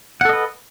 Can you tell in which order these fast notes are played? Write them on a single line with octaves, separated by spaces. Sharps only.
F#5 A4 D#5 B4